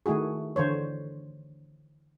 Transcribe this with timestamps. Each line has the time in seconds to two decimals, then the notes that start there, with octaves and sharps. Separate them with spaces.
0.06 D#3 A3 E4 F#4 G#4
0.56 D3 E3 C5 C#5